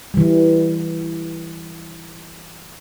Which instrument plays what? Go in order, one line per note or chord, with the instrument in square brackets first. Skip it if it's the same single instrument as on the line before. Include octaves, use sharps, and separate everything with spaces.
[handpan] E3 G3